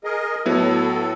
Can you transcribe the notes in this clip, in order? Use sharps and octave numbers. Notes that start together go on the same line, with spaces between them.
G#4 A#4 D#5
A2 F#3 B3 E4 A4